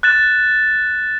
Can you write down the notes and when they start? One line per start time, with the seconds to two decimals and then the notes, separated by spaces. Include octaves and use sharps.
0.03 F#6 A6 E7